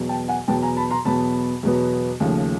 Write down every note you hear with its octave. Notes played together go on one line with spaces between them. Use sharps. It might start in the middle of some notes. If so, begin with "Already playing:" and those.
Already playing: E2 B2 F#3 B3
G5 A5
F#5 G#5
E2 B2 F#3 B3 G5 A5
G#5 A#5
A5 B5
A#5 C6
E2 B2 F#3 B3 A5 B5
E2 B2 F#3 B3
D#2 C#3 F3 A3